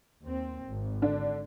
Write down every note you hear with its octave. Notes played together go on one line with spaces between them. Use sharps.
D#2 C4
G#1
D3 D4